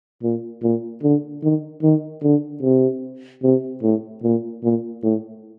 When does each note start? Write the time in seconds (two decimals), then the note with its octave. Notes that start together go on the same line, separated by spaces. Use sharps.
0.23 A#2
0.62 A#2
1.03 D3
1.43 D#3
1.83 D#3
2.22 D3
2.63 C3
3.43 C3
3.82 A2
4.23 A#2
4.63 A#2
5.03 A2